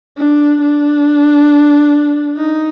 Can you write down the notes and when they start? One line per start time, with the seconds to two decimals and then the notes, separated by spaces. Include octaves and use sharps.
0.18 D4
0.62 D4
2.37 D#4